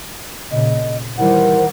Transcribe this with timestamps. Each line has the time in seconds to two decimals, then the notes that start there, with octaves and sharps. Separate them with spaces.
0.51 A#2 C#3 D#5
1.17 D#3 E3 G3 E4 A#4 C5 F#5